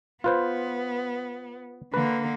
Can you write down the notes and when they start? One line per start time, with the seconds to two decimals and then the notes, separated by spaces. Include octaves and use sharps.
0.24 B3 F4 B4 C5
1.94 D3 A#3 B4